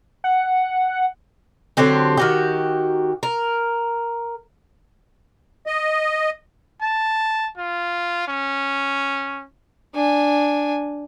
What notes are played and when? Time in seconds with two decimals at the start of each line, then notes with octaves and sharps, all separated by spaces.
0.24 F#5
1.77 D3 F#3 C4 G4
2.17 D#3 F#4 G4
3.23 A#4
5.66 D#5
6.82 A5
7.57 F4
8.28 C#4
9.94 D4 G#5